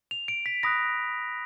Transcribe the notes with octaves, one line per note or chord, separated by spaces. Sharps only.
F7
D7
B6
B5 D#6 F#6 A#6